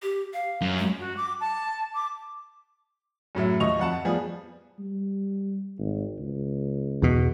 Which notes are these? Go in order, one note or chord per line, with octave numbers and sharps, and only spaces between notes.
G4
F5
F#2
G#3
F#4
D6
A5
D6
F#2 A2 F#3 E5
D#2 F3 D#5 C#6 F7
F2 F#5 A5
F3 G3 B3 G#4
G3
G#1
C#2
E2 B2